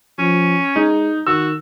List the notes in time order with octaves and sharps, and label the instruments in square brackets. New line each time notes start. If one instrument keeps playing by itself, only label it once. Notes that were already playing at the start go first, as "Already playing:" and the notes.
[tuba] F3 [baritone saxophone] C#4
[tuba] G#3 [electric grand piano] D#4
[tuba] D#3 [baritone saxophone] F#4 [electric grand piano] E6